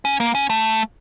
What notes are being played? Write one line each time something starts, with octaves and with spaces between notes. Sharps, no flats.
C#4
A#3
C#4
A3